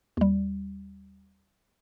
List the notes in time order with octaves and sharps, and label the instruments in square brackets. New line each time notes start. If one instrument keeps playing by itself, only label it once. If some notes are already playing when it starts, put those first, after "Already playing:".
[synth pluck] D#2 G3